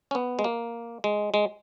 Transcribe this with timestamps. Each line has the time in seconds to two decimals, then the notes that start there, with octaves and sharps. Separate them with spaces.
0.11 C#4
0.15 B3
0.39 G#3
0.44 A#3
1.04 G#3
1.34 G#3